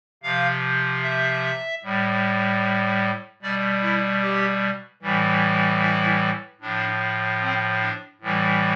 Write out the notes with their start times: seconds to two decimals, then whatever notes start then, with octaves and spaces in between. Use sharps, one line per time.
0.23 C3 F3 F5
1.03 E5
1.83 A2 G3
3.42 B2 G3 D5
3.82 E4
4.22 G4
5.02 A2 E3 G3
5.81 E4
6.61 A2 F3 D4
7.41 C4
7.81 D4
8.21 A2 E3 G3